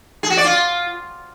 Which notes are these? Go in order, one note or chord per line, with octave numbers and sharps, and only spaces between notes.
G#4
F#4
D5
F4